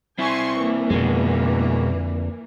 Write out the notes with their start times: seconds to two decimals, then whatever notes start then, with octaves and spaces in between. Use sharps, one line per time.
0.19 C4 E4 G#5 C6 C#6
0.58 E3 A#3
0.90 F2 B2 D3 G#3